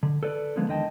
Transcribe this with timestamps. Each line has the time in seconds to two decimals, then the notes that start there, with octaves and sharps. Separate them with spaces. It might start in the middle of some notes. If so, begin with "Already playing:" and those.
0.03 D3
0.23 A4 B4 D5
0.56 D3 D#3 F3 G#3 A#3 B3
0.68 E2 D3 D#3 D#5 G5 A5